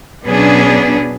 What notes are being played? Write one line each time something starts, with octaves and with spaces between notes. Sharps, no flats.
B2 F#3 B3 C#4 D4 G#4